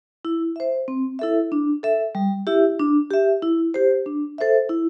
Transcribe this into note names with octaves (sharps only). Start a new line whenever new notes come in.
E4
C5 E5
C4
E4 A4 E5
D4
A4 E5
G3
E4 G4 E5
D4
G4 E5
E4
G4 C5
D4
A4 C5 E5
E4